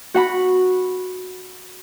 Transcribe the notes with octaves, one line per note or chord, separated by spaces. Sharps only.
F#4 F#5 B5